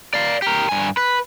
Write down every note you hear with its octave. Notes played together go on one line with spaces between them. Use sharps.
D5 F5
G4 A#4
G2 G#5
B4